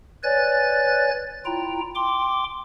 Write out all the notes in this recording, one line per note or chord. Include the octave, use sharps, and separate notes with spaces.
B4 C#5 D5 G#5 F#6 A6
E4 F4 G5 A#5
G5 C6 D6